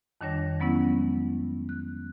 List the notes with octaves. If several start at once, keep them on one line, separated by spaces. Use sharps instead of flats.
F2 D#3 G3 D4 C#5 A#6
F#3 G#3 B3 C#4 E4
F#6